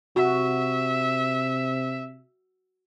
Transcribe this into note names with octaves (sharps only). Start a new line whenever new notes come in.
C3 F#4 E5